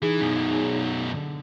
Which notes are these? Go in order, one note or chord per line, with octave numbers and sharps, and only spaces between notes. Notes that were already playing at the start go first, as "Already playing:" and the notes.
E3 D#4 G#4
F#2 B2
D3